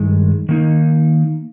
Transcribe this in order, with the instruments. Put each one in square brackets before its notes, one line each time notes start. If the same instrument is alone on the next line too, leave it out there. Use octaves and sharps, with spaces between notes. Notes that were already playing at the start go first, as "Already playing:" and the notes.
Already playing: [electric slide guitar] G2 D#3 G#3
D#3 A#3 D#4